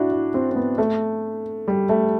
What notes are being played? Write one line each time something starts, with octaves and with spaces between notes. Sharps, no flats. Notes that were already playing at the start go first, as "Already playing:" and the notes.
Already playing: D4 E4 F#4
E4
C4
C4
B3
A3
G3
A3